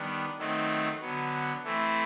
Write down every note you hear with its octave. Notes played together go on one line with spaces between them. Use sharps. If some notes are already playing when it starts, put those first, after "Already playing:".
Already playing: D#3 G3 B3 D4
D#3 F#3 A3 C4 D#4
D3 F#3 B3
E3 A3 C4 E4